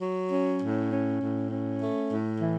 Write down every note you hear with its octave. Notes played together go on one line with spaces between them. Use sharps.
F#3
C#4
A2
C#4
A2
C#4
A3
A2
E3